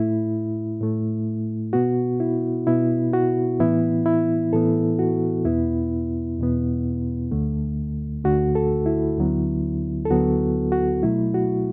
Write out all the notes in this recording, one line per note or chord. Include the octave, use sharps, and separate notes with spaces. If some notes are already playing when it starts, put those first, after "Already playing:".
Already playing: A2 A3 E4
A2 A3
B2 B3 F#4
E4
B2 B3 E4
F#4
A2 E3 B3 E4
E4
A2 E3 B3 A4
F#4
E2 B2 B3 E4
E2 B2 B3
D2 D3 A3
D2 D3 A3 F#4
A4
E4
D2 D3 F#3 B3
A4
D2 D3 F#3 B3 F#4
F#4
B2 F#3 A3 E4
F#4